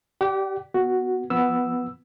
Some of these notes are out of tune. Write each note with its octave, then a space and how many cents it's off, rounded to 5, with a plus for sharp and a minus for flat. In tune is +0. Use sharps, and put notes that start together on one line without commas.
G4 -20 D5 +0 F#5 +45
B3 +0 F#4 +0
F3 -10 B3 +0 E6 +0